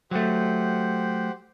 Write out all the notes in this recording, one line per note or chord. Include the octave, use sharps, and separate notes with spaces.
F#3 A3 G4 C5 F#5